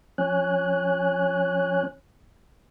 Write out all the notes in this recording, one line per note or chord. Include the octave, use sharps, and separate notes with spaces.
F3 C#4 C#5 G#5 F#6